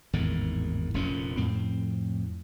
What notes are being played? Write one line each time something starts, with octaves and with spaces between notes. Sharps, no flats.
G#1 E2 A2 D#3
F1 F2 A#2 C#4
F2 A2 C4